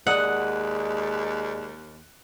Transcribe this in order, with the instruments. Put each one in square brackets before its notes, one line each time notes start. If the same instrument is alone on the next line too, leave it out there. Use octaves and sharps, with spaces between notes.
[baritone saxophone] D#2 [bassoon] G#3 [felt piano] D5 D#6 F#6 [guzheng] F#5